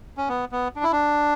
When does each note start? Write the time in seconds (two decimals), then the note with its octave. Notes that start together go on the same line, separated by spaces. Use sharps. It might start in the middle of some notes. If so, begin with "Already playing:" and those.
0.17 C#4
0.29 B3
0.52 B3
0.76 D4
0.84 E4
0.92 D4